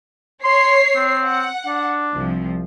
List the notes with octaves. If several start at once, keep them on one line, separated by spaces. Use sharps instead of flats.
C#5 C6 C7
C4
F#5
D4
C2 F3